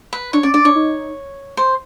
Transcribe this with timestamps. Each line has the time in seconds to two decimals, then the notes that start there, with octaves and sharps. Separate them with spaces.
0.13 B4
0.33 D4 C#5
0.43 C#4 D5
0.54 D4 D5
0.65 D4 C#5
0.75 D#4
1.57 C5